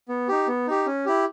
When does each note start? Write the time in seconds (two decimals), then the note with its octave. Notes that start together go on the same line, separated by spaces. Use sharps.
0.08 B3
0.28 D#4 G4
0.47 B3
0.67 D#4 G4
0.86 C#4
1.06 E4 G4